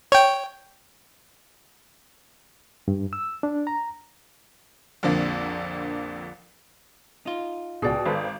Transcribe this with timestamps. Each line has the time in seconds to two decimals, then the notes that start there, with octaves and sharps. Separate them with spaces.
0.12 C#5 G5
2.88 G2
3.13 E6
3.43 D4
3.67 A#5
5.03 A#1 F2 D3 A#3
7.26 D#4 F4
7.82 C#2 B2 G#4 D5 G5
8.06 G#1 A4 B4 C5